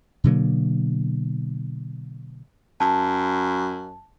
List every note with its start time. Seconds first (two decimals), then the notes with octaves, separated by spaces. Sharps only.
0.24 B2 D3 F#3 A#3
2.80 F#2 A5